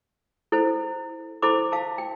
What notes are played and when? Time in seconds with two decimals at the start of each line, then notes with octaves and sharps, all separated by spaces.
0.52 E4 A4 C5
1.42 E4 A4 C5 B5 D6
1.72 F5 A5
1.98 G5